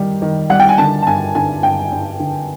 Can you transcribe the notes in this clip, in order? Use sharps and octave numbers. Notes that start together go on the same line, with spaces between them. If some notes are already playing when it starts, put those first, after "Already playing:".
Already playing: D#3 G3
D#3
G3 F#5
G5
G#5
D3 A5
A5
G2 G#5
D3 G#5
G2 G5
G2
D3